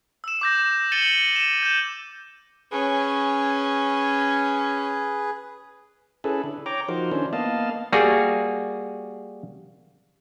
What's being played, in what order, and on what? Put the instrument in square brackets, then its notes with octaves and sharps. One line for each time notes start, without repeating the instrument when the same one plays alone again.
[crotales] E6 E7
D6 G6 A#6
A6 C#7 D#7 F#7 G7
D#7 E7
G6 E7
[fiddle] C#4 [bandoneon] G#4 B4
[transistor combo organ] C#4 E4 G#4 A4 B4
D3
C#5 G5 A#5 D6
F3 D#4 F#4 A#4 C5
D#3 C#4 D4 E4 C5
A#3 B3 D#5 F5 A5
[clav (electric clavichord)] G3 A#3 F#4 G#4